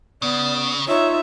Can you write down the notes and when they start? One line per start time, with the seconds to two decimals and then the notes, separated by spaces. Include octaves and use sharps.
0.22 C#3 B3 D5
0.87 D#4 F4 C#5 E5